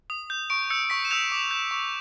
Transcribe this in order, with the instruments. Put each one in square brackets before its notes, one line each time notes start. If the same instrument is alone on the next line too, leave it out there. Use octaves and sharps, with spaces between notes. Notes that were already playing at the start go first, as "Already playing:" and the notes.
[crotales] D#6
G6
C#6 D7
E6 G6 C#7
C#6 B6
E7
E6 G6 F7
D6
G6
C#6